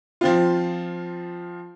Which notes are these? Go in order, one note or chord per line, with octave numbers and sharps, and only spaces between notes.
F3 C4 F4